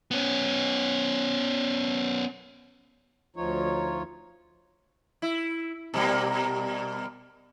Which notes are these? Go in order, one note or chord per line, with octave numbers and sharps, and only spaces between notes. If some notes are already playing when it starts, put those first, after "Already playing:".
B3 C#4
D2 F3 D#4 F4 C#5
E4
B2 G3 A#3